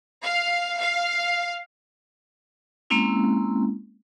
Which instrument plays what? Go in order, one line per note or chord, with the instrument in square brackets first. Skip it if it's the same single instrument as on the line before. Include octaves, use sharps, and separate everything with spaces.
[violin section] F5
F5
[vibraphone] G#3 A#3 C4 C#4 E4